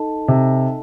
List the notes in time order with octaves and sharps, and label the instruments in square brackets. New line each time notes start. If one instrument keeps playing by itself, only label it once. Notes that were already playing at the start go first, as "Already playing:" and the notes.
Already playing: [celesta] D#4 A4 D#5 A5
[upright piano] C3